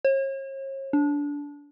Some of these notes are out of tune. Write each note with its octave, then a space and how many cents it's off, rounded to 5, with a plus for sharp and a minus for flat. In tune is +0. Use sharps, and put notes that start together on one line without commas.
C#5 -40
D4 -20